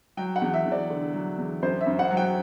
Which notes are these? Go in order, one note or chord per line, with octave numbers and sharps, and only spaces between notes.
F#3 G5
F#5
E2
E5
E2
D5
D3
F#3
E2
F#2 C5
E5
F#2
F#5
F#3
G5